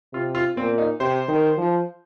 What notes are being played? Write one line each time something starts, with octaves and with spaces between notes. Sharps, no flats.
C3 F4
F4
A#2 C4
D#4
C3 C5
D#3
F3